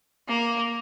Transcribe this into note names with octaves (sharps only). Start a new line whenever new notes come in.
A#3